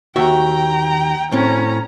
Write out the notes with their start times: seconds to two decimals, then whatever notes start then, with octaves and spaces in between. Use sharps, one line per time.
0.16 D#2 F#4 E5 G5 A#5
1.32 A2 C4 C#4 A#5